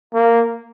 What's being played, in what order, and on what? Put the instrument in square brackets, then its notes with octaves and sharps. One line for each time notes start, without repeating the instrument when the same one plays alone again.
[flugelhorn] A#3